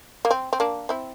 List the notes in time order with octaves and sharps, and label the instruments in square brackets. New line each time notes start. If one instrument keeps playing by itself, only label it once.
[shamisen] A#3
C4
C4
A#3 D4
C4 E4